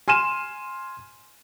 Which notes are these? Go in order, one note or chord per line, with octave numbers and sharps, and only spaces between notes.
G#5 C6 F6 D#7 E7